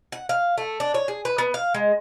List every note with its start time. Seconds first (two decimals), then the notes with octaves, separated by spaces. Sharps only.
0.12 F#5
0.29 F5
0.58 A3
0.80 D4
0.94 C#5
1.08 G#4
1.25 B4
1.38 B3
1.54 F5
1.74 G#3